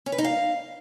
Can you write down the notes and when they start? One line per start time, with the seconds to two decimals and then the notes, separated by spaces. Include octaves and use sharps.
0.06 C#4
0.12 B4
0.18 D#4
0.24 F5